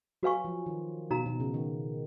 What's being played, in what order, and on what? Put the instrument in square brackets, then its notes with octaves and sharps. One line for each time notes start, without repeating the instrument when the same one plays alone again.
[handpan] F#3 [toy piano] F#4 B4 F5 G#5 C#6
[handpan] F3
D#3
[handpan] B2 [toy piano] D#4 F#4 A#4 F5 A#5
[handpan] B2
C#3
D#3